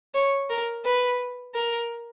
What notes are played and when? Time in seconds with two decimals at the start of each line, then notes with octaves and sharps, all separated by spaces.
0.14 C#5
0.50 A#4
0.85 B4
1.54 A#4